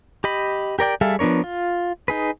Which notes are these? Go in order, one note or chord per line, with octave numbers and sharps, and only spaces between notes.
G4 D#5 B5
G4 A#4 D5 G5
G3 G#4 A4 E5 F5
F3 B3 D4 A#4 C#5
F4
D#4 G#4 B4